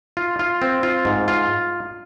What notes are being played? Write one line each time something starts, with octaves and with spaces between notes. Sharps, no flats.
F4
F4
C4
F4
G#2
F4